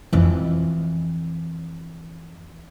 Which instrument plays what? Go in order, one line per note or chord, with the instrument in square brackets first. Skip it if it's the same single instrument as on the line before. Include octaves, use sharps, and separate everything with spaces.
[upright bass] F2 E3